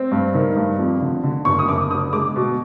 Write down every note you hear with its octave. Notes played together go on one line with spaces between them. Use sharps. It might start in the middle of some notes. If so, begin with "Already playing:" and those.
Already playing: C4
G2
D#3
G2
F2
D3
D3
F#1 C#6
D#6
F#1 D6
D3 D#6
G#3 D6
B2